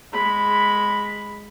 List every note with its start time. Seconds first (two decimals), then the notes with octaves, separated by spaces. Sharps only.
0.13 G#3 B5